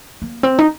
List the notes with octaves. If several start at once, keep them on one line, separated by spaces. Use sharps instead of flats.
A#3
C4
D#4